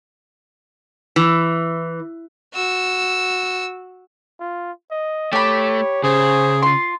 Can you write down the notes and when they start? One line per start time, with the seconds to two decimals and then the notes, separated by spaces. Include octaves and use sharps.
1.16 E3
2.54 F#4 E6
4.40 F4
4.91 D#5
5.33 A3 G4 C#5 B5
6.04 C#3 G#4 C5
6.62 F4 C6